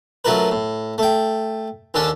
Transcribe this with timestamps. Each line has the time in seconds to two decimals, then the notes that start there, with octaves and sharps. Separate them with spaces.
0.25 F#2 F#3 A3 F4 A#4 B4
0.51 A2
0.98 A3 G5
1.94 D#2 D3 C#4 D4 A4